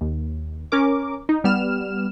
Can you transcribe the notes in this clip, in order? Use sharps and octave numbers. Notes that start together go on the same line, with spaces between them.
D#2
C#4 A#4 D6
D#4
G3 B3 F6 E7